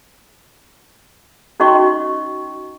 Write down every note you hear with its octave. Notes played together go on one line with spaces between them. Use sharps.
C#4 D#4 F#4 D#5 C6 C#6